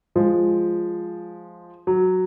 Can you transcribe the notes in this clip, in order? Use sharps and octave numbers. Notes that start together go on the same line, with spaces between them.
F3 G#3
F#3